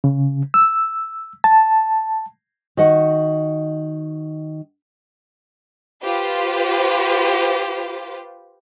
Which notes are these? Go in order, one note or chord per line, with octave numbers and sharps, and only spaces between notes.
C#3
E6
A5
D#3 F#4 D#5 F#5
F4 G4 B4 C5